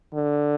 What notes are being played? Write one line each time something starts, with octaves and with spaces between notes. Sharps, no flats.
D3